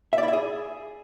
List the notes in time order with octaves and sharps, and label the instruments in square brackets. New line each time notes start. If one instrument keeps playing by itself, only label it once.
[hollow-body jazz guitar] E5
D5
E4
E5
G#4